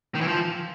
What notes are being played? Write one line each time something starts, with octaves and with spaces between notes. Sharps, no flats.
D#3
E3
F3